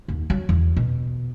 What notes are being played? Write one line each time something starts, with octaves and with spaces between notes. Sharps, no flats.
D#2
F#3
E2
B2